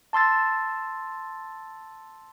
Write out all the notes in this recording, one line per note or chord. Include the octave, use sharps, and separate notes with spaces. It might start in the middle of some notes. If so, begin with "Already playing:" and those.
A5 C6 E6 A6